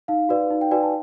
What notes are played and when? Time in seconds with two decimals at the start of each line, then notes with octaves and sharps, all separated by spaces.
0.08 D#4 F5
0.29 F#4 B4 D5
0.50 D#4
0.61 G5
0.71 F#4 B4 D5 G#5
0.83 A5